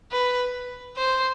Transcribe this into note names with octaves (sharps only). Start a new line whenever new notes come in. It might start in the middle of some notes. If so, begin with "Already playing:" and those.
B4
C5